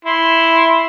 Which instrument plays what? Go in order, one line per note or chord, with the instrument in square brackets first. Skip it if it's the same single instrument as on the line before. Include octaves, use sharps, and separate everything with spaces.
[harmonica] E4 C6